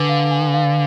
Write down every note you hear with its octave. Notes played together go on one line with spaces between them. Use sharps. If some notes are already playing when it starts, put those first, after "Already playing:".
Already playing: D3 B4 G#5
F5
G#5
F5